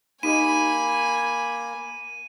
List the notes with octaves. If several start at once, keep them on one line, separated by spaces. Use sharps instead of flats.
A#3 D#4 G4 D#5 G#5 B5 D#7